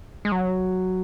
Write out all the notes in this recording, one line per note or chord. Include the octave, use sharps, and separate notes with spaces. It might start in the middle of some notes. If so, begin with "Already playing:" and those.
G#3
F#3